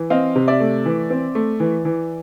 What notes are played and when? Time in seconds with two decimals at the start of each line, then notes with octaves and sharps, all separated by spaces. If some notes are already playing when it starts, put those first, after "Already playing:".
Already playing: E3
0.10 C4 D#5 F5
0.36 C3
0.48 D5 E5
0.60 A3
0.85 E3
1.10 C4
1.35 A3
1.60 E3
1.85 E3